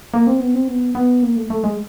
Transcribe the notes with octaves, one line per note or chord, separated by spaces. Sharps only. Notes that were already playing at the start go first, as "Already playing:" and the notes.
A#3
C4
B3
C4
B3
B3
A#3
A3
A3
G#3